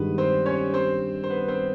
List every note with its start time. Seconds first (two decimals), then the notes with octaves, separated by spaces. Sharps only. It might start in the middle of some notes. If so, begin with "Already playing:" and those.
Already playing: G2 D#3 G#3 B3 B4
0.18 C4 C5
0.46 C#4 C#5
0.74 C4 C5
1.24 C5
1.30 B3 B4
1.48 C4 C5